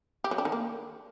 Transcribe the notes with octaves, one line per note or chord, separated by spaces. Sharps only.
G4
F#3
D4
D#3
A#3